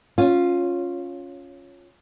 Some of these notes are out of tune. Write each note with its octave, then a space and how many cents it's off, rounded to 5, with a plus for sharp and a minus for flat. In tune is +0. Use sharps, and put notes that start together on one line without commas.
C#4 +0 F4 +10 C#5 +0